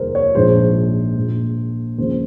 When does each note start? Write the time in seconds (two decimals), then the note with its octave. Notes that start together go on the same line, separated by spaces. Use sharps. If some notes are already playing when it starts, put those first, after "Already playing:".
Already playing: F1 D#2 D#3 G3 G#4 A#4 C5
0.15 C#5
0.35 A#1 G#2 F3 G#3 C5
1.16 A#1 A#2 G#3
1.98 D#2 C#3 F3 G#3 C5